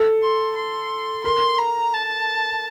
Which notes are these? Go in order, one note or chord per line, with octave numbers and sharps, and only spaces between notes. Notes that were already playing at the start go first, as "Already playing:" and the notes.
Already playing: A4
C6
C6
A#4 C6
A#5
A5